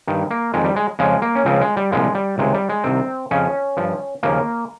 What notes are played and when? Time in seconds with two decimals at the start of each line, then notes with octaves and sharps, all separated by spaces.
0.07 G2 D#3
0.31 A#3
0.54 F2 D#3 G#3
0.64 G3
0.76 G#3
0.99 F2 C#3 F3 G#3
1.22 A#3
1.35 C#4
1.45 C#2 C#3 F3 C4
1.61 G#3
1.77 G3
1.92 C2 A#2 F3 G#3
2.15 G3
2.38 C#2 C3 D#3 G#3
2.54 G3
2.69 G#3
2.84 C2 C3 D#3 C4
3.31 F2 C#3 F3 C#4
3.77 G2 F3
4.23 D#2 C#3 F3 A#3